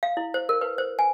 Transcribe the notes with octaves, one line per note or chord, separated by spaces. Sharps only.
F5
E4
C5
A#4
B4
C5
G#5